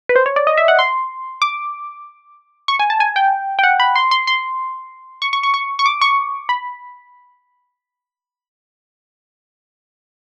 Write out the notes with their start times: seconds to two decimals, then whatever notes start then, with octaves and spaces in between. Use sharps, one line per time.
0.09 B4
0.16 C5
0.26 C#5
0.36 D5
0.47 D#5
0.57 E5
0.68 F#5
0.79 C6
1.42 D6
2.68 C#6
2.79 G#5
2.90 A5
3.00 G#5
3.16 G5
3.59 G5
3.63 F#5
3.80 B5
3.96 C6
4.11 C6
4.27 C6
5.22 C#6
5.33 C#6
5.43 C#6
5.54 C#6
5.79 C#6
5.86 D6
6.01 C#6
6.49 B5